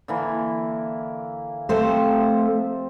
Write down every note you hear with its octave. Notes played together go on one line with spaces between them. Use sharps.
D3 E3 A#3
C3 F3 A3 C4 A4 C5